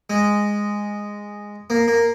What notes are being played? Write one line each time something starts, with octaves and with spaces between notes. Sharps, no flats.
G#3
A#3
A#3